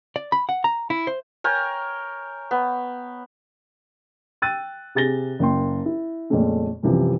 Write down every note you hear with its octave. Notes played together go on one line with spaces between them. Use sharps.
D5
B5
F#5
A#5
E4
C5
A#4 C#5 G5 G#5
B3
G5 E6 F#6 A6 D#7
C3 G#4 A6 A#6 G7
F#1 A#3 G5 C6
E4
F2 A#2 C#3 G#3 A3 C#4
C2 F#2 C3 E3 F3